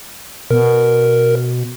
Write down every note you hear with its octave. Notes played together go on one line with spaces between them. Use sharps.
B2 A#4